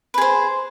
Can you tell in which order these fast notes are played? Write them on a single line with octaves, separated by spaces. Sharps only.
B4 G#4 C5